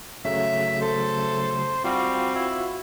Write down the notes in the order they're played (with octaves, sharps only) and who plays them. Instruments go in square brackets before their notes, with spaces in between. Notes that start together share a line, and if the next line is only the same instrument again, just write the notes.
[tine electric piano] C#3 F#3 A3 [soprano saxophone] E5
[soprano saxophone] A4 [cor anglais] C5
[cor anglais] G3 [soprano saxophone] C4 [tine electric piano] F4 F#4 F5
[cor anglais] E4